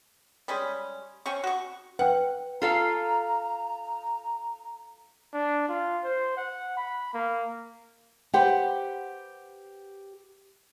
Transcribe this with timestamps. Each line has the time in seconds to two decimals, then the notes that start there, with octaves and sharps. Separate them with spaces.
0.48 G3 G#3 C#4
1.26 C4 C#4 C#6
1.44 F#4 C#6
1.99 B4 F#5 G5
2.62 F4 A4 F5 A#5
5.34 D4
5.69 F4
6.04 C5
6.37 F#5
6.77 B5
7.13 A#3
8.34 G4 B4 C5 F#5 G5